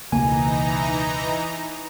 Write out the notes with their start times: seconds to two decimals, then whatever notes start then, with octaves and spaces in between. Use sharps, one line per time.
0.12 E1 C#2 E3 A#3 D#4 G#5 A#5